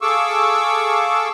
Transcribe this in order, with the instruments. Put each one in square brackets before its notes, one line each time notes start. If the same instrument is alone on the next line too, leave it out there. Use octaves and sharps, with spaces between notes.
[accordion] G#4 A4 F5 C#6 D6 E6